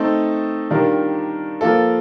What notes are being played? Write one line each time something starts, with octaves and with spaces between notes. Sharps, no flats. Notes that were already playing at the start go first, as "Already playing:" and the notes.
Already playing: A3 C4 D#4 A4
D#3 G3 D4 F4 A#4
F3 A#3 F4 A4